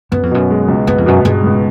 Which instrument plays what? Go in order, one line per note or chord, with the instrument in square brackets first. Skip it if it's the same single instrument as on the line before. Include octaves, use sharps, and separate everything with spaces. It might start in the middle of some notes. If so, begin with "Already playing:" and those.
[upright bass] F#2 [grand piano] B3
[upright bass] F2
[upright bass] F#2 [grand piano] B2
[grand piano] G#3
C#2
[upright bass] F#2 [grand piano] B3
[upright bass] F2
[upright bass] F#2 [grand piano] B2
[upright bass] G2 [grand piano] G#3
[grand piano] C#2